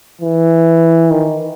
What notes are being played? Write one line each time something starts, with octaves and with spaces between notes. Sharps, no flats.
E3
D#3